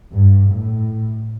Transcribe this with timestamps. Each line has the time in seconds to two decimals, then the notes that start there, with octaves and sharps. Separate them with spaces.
0.12 G2
0.50 A2